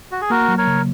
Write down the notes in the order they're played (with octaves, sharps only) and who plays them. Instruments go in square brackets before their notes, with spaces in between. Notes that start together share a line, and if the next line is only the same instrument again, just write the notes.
[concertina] F#4
G#4
[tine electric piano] A#3 [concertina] F#4 A#4
[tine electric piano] F#3
[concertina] A#4 C#5
[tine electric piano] C#3